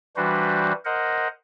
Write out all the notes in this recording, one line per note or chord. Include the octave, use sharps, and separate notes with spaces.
E3 G3 D4 F#4 B4 C5
A#4 C5 D#5 F#5